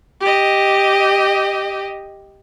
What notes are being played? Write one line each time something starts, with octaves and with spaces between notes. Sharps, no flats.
G4 D#5